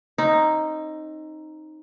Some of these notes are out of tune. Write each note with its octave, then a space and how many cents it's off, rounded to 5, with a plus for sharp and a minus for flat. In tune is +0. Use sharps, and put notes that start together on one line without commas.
C4 +35 D#4 +0